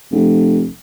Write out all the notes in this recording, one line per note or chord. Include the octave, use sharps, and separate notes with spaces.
F1